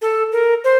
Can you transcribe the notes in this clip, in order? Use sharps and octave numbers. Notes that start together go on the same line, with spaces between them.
A4
A#4
C5